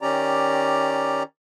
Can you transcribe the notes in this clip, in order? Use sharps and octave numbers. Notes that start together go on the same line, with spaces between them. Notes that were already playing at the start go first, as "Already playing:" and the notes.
D#3 C#4 G4 D5 A#5